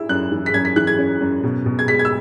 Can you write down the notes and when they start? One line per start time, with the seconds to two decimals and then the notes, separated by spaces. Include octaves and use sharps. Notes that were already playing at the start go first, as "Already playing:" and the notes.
Already playing: E4 E6
0.09 F#2 F#6
0.32 E3
0.46 B6
0.54 F#2 G#6
0.65 B6
0.76 E3 F#6
0.87 G#6
0.99 C#4
1.21 F#2
1.43 B2
1.66 B2
1.79 G#6
1.88 G#3 B6
1.99 G#6
2.05 E6